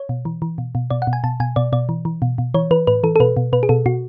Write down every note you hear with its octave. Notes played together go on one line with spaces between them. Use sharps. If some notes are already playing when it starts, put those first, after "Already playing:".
Already playing: C#5
B2
E3
E3
B2
B2
B2 D5
F#5
B2
G#5
B2 A5
B2 G#5
B2 D5
B2 D5
E3
E3
B2
B2
E3 C#5
E3 B4
A2 B4
E3 A4
A4
B2 B4
B2
B2 B4
G#4
B2 A4
B2 F#4